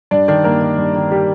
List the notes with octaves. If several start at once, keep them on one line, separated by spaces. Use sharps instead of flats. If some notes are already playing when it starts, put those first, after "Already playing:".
G2 D4 D5
D#3 D4 D5
G2 A#3 A#4
D#3
G2
D#3
G3 G4